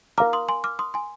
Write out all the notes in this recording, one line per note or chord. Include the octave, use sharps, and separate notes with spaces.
A#4 F5 A#5 D6 F6
C6 D#6
G#5 C6
D6 F6
C6 D#6
G#5 C6